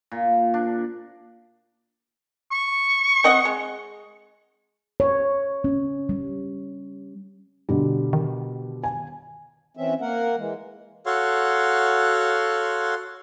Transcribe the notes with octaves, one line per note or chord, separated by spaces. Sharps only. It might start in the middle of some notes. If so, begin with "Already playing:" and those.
A#2
D4
C#6
C4 D#5 F#5
G#3
C#5
C#4
G3
B2 D3 G3
D#3
G#5
E3 C4 C#4 E5
A#3 A#4 F#5
E3 G#3
F#4 A4 C#5 F5 F#5 C6